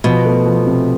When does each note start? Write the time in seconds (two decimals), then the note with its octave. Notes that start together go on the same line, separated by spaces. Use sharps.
0.04 B2 F3
0.25 A3
0.46 F3
0.67 C3